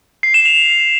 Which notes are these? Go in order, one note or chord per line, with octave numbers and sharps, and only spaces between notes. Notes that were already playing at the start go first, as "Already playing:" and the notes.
C7
E7
F7